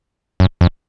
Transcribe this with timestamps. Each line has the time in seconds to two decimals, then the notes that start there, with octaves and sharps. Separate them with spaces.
0.40 F#2
0.61 F2